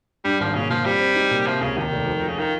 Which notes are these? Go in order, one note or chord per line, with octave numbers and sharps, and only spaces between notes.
G2 G3
G#1 F3
A#2 C#3
A#2 F3
G3 C4
C4
D#4
A#2
C3 F3
C#2 C#3
D#2 D#3
F1
F3
F3
C#3
D#3 F4